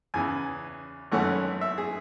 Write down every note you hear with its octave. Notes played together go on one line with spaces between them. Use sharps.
E2 C#3 E3 G#5
G#1 F#2 E3 A3 C#4 F#5
E5
G#4